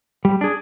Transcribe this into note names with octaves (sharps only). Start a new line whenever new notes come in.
G3
D4 G#4